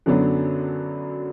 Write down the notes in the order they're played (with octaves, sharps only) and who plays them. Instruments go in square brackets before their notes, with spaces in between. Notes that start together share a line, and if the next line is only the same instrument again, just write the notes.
[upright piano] F#2 D3 F#3 B3 D4